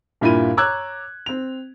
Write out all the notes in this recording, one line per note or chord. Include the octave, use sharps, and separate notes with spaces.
G2 A#2 E4 F4 B5 D#7
C#5 A#5 D6 E6 F#6 G#6
C4 F7